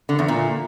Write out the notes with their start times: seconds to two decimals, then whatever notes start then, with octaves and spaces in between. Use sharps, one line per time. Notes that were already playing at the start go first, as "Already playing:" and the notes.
0.09 D3
0.19 E2
0.28 A#2